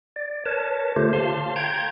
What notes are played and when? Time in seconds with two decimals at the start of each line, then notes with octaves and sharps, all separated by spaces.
0.16 D5
0.45 A#4 B4 C#5 A5
0.96 D3 A3 F4 G4 C5
1.13 F5 A5 C6
1.56 G5 A#5 G6 G#6